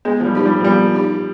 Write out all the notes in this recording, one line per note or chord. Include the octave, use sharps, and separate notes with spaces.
G#3 B3
F3
G3
F3 D#4 G4
G3
F3
G3 B3
D#4 G4